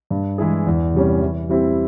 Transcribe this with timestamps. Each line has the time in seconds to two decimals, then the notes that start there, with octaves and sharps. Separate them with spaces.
0.10 G2
0.38 E3 G#3 E4 G#4
0.67 E2
0.94 C3 G3 C#4
1.21 E3
1.49 G3 C4 E4 G4